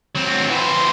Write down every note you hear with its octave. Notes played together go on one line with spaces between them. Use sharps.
F#3 C4
E3 C5